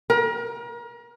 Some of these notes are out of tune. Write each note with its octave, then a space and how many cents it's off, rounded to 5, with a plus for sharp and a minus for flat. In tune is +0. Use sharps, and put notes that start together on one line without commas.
A#4 +35